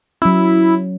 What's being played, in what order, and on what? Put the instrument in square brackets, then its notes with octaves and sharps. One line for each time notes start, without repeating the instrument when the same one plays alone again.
[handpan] F#3 C#4 [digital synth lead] E4